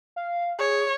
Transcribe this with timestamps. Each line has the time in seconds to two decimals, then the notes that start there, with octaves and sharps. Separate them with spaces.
0.16 F5
0.59 G#4 C#5